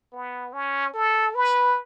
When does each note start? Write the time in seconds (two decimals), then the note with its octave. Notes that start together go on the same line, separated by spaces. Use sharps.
0.12 B3
0.53 C#4
0.94 A4
1.35 B4